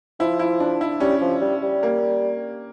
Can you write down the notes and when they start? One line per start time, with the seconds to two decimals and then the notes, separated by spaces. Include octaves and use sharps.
0.20 F3 E4
0.39 E4
0.60 D4
0.81 E4
1.00 G3 C#4
1.21 F3
1.41 G3
1.62 G3
1.83 A#3